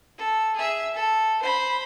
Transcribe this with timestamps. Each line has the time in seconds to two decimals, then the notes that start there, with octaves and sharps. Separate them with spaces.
0.18 A4
0.56 G#4 E5
0.94 A4
1.42 C5 B5